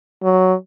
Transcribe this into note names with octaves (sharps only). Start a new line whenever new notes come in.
F#3